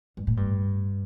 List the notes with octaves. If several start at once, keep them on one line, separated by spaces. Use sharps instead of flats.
G2
A2
G2